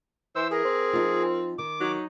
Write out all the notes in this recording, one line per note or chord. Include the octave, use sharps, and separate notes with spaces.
E3 C5 E6
G#4 A#4
C4
F3 D#4 F4
D#3 D6
F#3 D#4